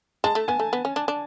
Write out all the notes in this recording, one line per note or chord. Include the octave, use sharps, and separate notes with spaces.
G#3 A5
A3
B3 G#5
A3
B3
C#4
D4
D4